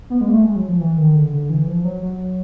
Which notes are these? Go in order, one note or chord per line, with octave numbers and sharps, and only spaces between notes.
B3
G#3
A#3
A3
G#3
F#3
F3
E3
D#3
D3
D3
E3
F3
F#3
F#3